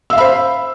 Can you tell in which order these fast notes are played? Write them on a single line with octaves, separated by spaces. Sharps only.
E6 F5 E5 B5 C5